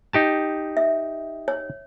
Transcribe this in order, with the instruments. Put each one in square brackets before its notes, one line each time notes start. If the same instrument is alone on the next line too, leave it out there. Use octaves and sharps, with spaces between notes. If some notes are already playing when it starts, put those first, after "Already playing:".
[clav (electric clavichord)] D#4 G4 A5
[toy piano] E5
C#5